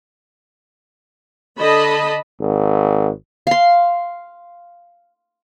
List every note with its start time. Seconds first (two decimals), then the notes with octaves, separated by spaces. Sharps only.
1.59 D3 D#5 A5 B5
2.40 G#1
3.47 F5 C6